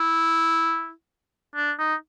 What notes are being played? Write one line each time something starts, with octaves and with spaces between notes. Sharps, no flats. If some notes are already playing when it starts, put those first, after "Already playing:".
Already playing: E4
D4
D#4